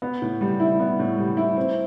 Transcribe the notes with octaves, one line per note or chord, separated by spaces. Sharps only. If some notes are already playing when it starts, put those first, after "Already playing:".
B3
A2
G3
E4
B3
A2
G3
E4
C4